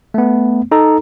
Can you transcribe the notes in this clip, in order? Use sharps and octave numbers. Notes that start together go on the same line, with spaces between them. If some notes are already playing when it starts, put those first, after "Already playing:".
A3 B3
D#4 A4 A#5